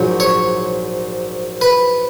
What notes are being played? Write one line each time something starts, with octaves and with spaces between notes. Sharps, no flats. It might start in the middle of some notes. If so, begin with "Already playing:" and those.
Already playing: A#1 G#2 F#3
C#5
B4